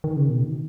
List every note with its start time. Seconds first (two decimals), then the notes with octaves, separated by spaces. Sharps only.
0.04 D#3
0.16 C#3
0.29 B2
0.41 D#3